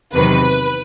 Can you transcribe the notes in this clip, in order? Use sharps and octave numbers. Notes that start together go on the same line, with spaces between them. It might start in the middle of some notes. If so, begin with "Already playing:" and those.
E2 C3 D#3 F#3 B4